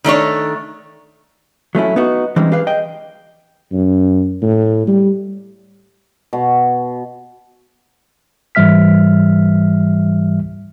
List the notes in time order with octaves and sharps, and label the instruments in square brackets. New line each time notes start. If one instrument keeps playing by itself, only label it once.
[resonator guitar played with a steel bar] D#3 A3 D4 C#5
[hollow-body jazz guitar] F#3 A3 C#4 E4
B3 D#4 F#4
E3 G3 G#3 C4 C#4 D#4
G4 G#4 B4 F5
D#5 G5
[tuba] F#2
A2
G3
[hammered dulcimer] B2
[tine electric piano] G#2 E3 G3 E5 F6 B6